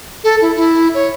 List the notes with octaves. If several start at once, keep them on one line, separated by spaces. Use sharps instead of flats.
A4
E4
E4
C#5